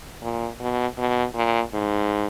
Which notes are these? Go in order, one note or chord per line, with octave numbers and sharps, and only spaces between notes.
A#2
B2
B2
A#2
G#2